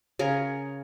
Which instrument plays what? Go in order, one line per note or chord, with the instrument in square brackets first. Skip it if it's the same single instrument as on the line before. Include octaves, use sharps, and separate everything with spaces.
[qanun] C#3 G#4 A#4